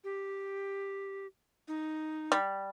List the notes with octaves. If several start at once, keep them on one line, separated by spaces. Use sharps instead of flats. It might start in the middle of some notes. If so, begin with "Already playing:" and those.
G4
D#4
G3